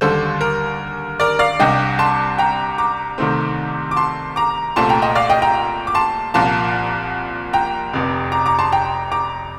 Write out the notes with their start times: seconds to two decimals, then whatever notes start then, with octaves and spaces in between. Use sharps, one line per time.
0.01 D#2 D3 G3 A4 C5
0.41 A#4
1.20 A#4 D5
1.39 D5 F5
1.60 C2 C3 G3 D4 D#5 G5
1.99 A5 C6
2.38 G5 A#5
2.78 A#5 D6
3.18 C2 C3 D#3 A3 C4
3.91 D6
3.96 A5 C6
4.36 A#5 D6
4.76 C2 A#2 A3 C4 A5 C6
4.89 G5 A#5
5.02 D#5 G5
5.15 D5 F5
5.30 D#5 G5
5.42 G5 A#5
5.87 D6
5.95 A5 C6
6.34 C2 A#2 F3 A#3 A5 C6
7.53 G5 A#5
7.93 F1 F2 C3
8.32 A#5 D6
8.46 A#5 D6
8.59 A5 C6
8.72 G5 A#5
9.12 A#5 D6